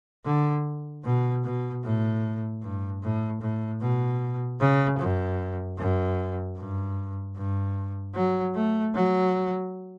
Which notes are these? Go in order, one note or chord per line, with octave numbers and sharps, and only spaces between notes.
D3
B2
B2
A2
G2
A2
A2
B2
C#3
F#2
F#2
G2
G2
F#3
A3
F#3